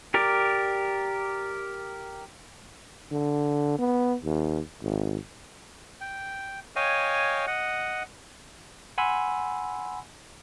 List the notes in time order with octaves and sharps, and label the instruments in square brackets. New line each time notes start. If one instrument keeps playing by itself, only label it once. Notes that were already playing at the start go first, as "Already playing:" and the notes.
[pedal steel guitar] G4 A#4 D5
[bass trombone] D3
B3
D#2
G#1
[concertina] G5
C#5 D#5 F5 G5 G#5
D#5 F#5
[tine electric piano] F#5 G#5 B5 C6 E6